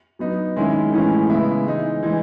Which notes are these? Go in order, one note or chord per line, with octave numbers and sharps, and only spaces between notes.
F#3 B3 D#4
D#3 G#3 C#4 E4
A2 E3 G#3 C#4 E4
C#3 G#3 B3 E4
E3 G#3 D#4
E3 G#3 D#4